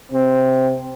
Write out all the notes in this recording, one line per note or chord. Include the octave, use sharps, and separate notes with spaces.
C3 C4